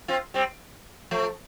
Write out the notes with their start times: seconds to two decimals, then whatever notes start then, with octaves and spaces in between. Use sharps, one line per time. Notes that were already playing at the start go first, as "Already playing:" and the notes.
0.08 C4 F4
0.34 G3 C4
1.11 F3 A3